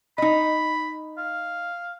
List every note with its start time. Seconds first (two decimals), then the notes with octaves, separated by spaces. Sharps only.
0.18 D#4 D#5 B5
1.18 F5